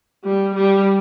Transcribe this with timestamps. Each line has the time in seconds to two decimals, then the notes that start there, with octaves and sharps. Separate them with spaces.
0.24 G3
0.55 G3